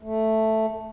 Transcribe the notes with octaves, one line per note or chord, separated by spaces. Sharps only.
A3